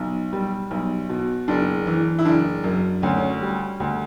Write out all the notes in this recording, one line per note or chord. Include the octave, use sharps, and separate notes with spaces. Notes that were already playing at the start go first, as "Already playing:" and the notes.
Already playing: B1
G3
B1
B2
F#1 D4
E3
E4
F#1 D4
F#2
D2 C#4
C#4
G3
D2